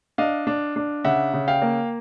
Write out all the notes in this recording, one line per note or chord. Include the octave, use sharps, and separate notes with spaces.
D4 D#5 F5
D4
D4
C#3 E5 F#5
C#3
F5 G5
A#3